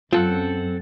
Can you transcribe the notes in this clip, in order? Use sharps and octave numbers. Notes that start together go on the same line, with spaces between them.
F#2 C4 F4 A4 F#5